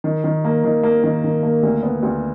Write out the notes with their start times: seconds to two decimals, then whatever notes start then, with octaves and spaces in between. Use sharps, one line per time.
0.04 D#3
0.24 D#3
0.45 A#3
0.64 D#3
0.83 A#3
1.04 D#3
1.24 D#3
1.43 A#3
1.63 D2
1.83 B3
2.03 D2